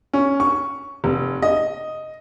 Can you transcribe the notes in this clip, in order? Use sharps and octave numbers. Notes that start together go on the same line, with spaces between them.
C#4
C#6
F1
D#5